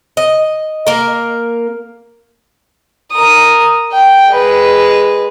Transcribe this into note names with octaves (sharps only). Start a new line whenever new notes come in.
D#5
A#3 A#4
A#4 D#6
G5
G#3 B4